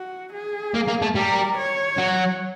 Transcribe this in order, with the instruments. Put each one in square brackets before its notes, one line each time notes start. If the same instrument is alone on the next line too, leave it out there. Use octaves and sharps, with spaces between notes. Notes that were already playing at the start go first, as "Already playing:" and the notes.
Already playing: [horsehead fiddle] F#4
G#4
[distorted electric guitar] A#3
A#3
A3
[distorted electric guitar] G3 [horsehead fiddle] A#4
[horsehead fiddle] C#5
[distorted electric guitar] F#3